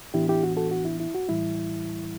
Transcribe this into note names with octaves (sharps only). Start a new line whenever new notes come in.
A2 E3 B3 D4 E4 G4
E4 G4
F#4
F#4 A4
F#4
E4
E4
F#4
A2 E3 G3 E4